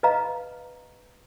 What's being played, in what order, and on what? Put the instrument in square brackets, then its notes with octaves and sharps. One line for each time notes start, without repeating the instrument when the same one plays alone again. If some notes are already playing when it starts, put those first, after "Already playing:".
[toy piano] B4 D#5 F5 A#5